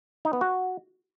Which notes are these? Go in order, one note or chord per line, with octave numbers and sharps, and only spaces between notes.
D#4
B3
F#4